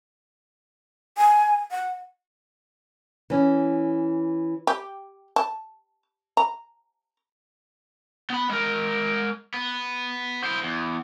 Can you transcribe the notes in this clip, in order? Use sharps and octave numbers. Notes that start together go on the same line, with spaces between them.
G#5
F#5
E3 C#4
G4
A5
A#5
B3 B5
G#3 A#4
B3
E4 C5
E2